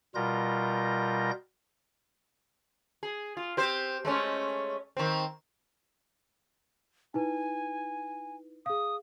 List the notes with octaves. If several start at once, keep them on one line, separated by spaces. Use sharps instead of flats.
B2 G3 F4 A#4 G6 A#6
G#4
F4
C4 G4 C5
G#3 A3 C#4
D#3 C4
D#4 E4 B4 G#5
G#4 F5 D#6